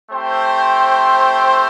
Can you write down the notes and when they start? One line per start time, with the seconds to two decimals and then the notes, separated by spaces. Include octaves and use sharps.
0.10 A3 C4 G4 C5 G5